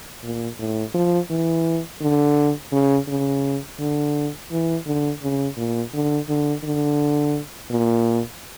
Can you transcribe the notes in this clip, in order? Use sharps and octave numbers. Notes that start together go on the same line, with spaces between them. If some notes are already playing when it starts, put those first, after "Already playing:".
A#2
A2
F3
E3
D3
C#3
C#3
D3
E3
D3
C#3
A#2
D3
D3
D3
A#2